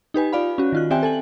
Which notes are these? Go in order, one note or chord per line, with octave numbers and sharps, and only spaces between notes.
D#4 G4 B4 G#5
F4 D5 F5 B5
C#4 F#4
D#3 F4 F#6
C4 G4 D5 E5 G5 G#5
A4 G#5 F#7